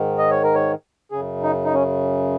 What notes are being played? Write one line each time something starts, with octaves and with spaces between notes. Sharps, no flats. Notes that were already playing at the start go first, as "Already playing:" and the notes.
Already playing: G#2 D#3
D#5
C#5
A#4
C#5
F#2 C#3 G#4
D#4
D#4
C#4